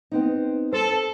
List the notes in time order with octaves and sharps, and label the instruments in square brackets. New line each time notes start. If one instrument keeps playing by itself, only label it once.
[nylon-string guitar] B3 C4 D#4
[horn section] A4 [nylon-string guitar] C5